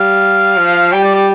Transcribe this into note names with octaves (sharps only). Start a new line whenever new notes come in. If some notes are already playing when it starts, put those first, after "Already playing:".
Already playing: G3 F5
F3
G3 G5
D5
D5